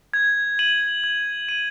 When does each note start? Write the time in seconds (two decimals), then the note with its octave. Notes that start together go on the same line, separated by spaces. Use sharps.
0.14 G#6
0.59 D#7 F#7
1.04 G#6
1.49 D#7 F#7